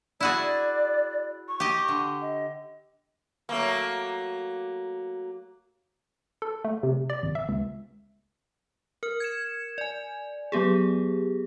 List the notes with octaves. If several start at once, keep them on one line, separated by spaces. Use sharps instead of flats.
E4 F#4 G#4 D5
C#6
G4 D#5
D3
D#5
F#3 A3 A#3
A4
A3
C3
D5
G#1
E5
C#2
A#4 F6
G#6 C#7 E7
D5 G#5
F#3 B3 G4 G#4